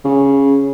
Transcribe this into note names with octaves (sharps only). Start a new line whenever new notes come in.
C#3